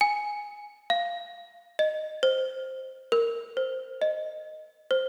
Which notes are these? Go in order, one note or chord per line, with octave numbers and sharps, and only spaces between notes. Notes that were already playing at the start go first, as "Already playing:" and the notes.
G#5
F5
D#5
C5
A#4
C5
D#5
C5